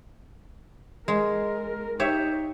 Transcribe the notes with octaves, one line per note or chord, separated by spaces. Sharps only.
G#3 A#4
D#4 G4 C#5 E5